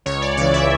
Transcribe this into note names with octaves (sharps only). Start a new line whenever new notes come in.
C#2 C#5
D5
C#3 E3 D5
E5